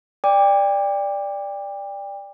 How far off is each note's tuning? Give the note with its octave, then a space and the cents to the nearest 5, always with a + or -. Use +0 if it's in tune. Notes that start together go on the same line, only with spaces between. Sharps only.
D5 +0 G5 +30 D6 +0